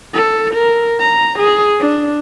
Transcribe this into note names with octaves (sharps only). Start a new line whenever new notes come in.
A4
A#4
A#5
G#4
D4